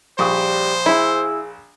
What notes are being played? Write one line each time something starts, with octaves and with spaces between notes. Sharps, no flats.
A#1 G3 C5 C#6 D#6
E4 G#4